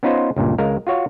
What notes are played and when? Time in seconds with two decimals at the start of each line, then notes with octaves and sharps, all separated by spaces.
0.03 B3 C#4 D#4 F4 B4 C5
0.36 C#2 G2 A#2
0.58 C#2 G#3 A#4 F5
0.87 F4 F#4 C#5 F5